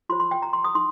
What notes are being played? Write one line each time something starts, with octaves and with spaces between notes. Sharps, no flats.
F4 C5 C6
C6
G5
A#5
C6
D#6
D#4 C6